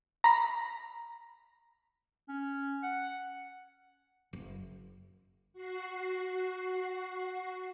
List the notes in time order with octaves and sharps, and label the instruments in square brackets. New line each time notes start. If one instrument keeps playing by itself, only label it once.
[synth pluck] A#5 B5
[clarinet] C#4
F#5
[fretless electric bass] F#1
[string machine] F#4 C7